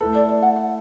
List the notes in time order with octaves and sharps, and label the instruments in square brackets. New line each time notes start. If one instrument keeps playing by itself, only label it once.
[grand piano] A3 E4 A4 [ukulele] B4
[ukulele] D5
D5
F#5
F#5